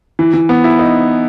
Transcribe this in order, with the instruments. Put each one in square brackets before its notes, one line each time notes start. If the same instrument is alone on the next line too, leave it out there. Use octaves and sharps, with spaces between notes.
[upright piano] E3
E3
B3
E4
D#4